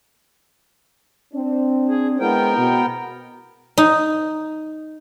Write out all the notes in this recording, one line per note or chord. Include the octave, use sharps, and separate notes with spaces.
C4 D4
G#4
G#3 B3 E4 A#4 C5 G5
B2
D#4